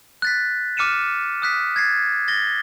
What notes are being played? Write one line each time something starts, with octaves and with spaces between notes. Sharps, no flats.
F#6 A6 B6
D6 F6 C#7 D#7 E7
D#6 F#6 B6
G#6 A6 C7
A6 A#6 G7